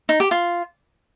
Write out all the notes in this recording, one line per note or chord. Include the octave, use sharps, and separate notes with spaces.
D#4
G4
F4